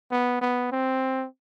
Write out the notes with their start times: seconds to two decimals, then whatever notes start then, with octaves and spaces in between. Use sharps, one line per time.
0.12 B3
0.41 B3
0.72 C4